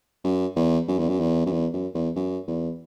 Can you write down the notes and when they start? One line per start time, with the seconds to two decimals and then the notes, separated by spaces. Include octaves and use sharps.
0.24 F#2
0.56 E2
0.88 F#2
0.99 E2
1.09 F#2
1.20 E2
1.46 F#2
1.52 E2
1.73 F#2
1.94 E2
2.16 F#2
2.47 E2